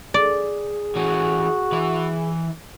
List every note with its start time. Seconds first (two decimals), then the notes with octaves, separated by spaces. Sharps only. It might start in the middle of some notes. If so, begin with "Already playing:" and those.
0.14 G#4 D5
0.96 E3 C#4 F#4
1.72 E3 B4